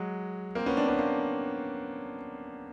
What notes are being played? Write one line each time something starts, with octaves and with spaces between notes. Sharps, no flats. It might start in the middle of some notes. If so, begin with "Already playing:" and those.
Already playing: F#3 G#3
A#3 C4
B3 C#4
C4 D4
B3 C#4
A#3 C4